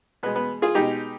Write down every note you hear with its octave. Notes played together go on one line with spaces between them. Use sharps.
B2 G#3 B3
B3
F4 G#4
B2 G#3 D#4 G4